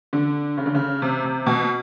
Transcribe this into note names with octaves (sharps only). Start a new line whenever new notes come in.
D3
C#3
D3
C#3
C3
C3
B2